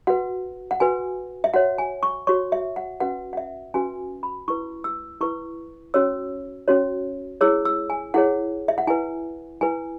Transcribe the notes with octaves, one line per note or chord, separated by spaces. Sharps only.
F#4 B4 F#5
F#5
F#4 B4 G#5
E5
F#4 C#5 F#5
G#5
C#6
F#4 C#5 C#6
E5
F#5
C#4 F#4 B4 F#5
F#5
E5
C#4 F#4 B4 G#5
B5
E4 B4 C#6
E6
E4 B4 C#6
C#4 F#4 C#5 E6
C#4 F#4 C#5
E4 G#4 C#5 E6
E6
G#5
E4 G#4 C#5 F#5
E5
F#5
E4 B4 G#5
E4 B4 G#5